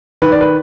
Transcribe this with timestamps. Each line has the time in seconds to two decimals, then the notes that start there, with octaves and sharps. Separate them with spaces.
0.22 D#3 B4
0.32 D5
0.41 B4